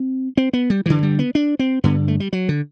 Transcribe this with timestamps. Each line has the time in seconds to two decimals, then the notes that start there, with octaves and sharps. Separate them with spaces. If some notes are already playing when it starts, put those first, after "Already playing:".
Already playing: C4
0.37 C4
0.53 B3
0.70 G3
0.86 G2 D3 E3
1.03 G3
1.19 B3
1.35 D4
1.59 C4
1.84 G2 D3 B3
2.08 A3
2.20 G3
2.33 F#3
2.49 D3